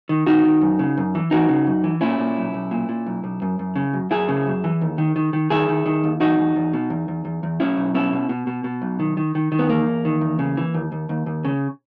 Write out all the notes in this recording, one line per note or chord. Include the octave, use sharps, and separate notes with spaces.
D#3
D#3 D#4 F#4
D#3
F#2
C#3
F#2
E3
E3 D#4 F#4
C#3
F#2
E3
A#2 C#4 E4
A#2
B1
B1
A#2
A#2
B1
B1
F#2
F#2
C#3
F#2
F#2 E4 G#4
C#3
F#2
E3
D#2
D#3
D#3
D#3
D#3 E4 G#4
D#3
D#3
D#2
E2 D#4 F#4
E2
E2
B2
E2
E2
E2
E2
B1 C#4 E4
B1
B2 C#4 E4
B2
B2
B2
B2
B1
D#3
D#3
D#3
D#3
B3
E2 A#3
E2
D#3
E2
C#3
E3
D#2
D#2
D#2
D#2
C#3